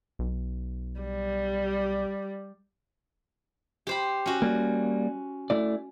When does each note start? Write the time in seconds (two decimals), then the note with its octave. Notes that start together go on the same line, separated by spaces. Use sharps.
0.19 B1
1.01 G3
3.87 G4 C5 B5
4.26 C#4 F#4
4.42 G3 A#3
5.50 A3 E4 D5